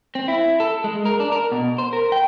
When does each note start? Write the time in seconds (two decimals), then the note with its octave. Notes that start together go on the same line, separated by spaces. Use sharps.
0.15 C4
0.28 E4
0.60 A4
0.84 G#3
1.05 A#4
1.20 D4
1.32 A#4
1.52 B2
1.78 C5
1.93 A#4
2.12 G5